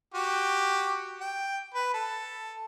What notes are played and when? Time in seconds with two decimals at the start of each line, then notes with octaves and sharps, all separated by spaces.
0.14 F#4 G4
1.21 G5
1.74 B4
1.94 A4